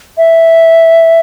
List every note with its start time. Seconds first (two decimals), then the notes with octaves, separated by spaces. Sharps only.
0.17 E5